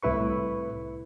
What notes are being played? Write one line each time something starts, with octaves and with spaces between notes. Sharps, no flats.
C2 A2 E4 B4 C#6